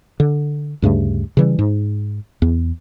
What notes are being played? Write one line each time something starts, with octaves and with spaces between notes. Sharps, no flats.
D3
D2 G2 C#3 A3
C#3 E3 G3
G#2
E2